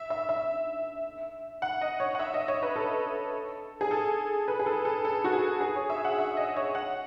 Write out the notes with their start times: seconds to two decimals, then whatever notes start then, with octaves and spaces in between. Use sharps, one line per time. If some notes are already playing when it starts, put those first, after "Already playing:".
Already playing: E5
0.10 E5
0.29 E5
1.62 F#5
1.81 D#5
2.00 C#5
2.15 F#5
2.19 E5
2.34 D#5
2.48 C#5
2.63 B4
2.76 A4
3.81 G#4
3.91 A4
4.48 B4
4.59 G#4
4.66 A4
4.85 A4
5.05 A4
5.24 F#4
5.33 G#4
5.61 G#4
5.76 C#5
5.89 E5
6.05 F#5
6.19 E5
6.37 D#5
6.56 C#5
6.75 F#5